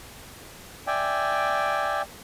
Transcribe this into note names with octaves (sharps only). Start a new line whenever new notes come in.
D5 E5 G5 G#5